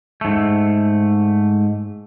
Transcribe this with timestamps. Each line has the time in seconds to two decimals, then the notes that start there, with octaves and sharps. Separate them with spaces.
0.21 G#2 A3